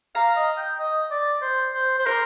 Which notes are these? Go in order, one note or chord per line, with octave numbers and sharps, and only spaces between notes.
F5 A#5
D#5
G5
D#5
D5
C5
C5
C5
A#4 C6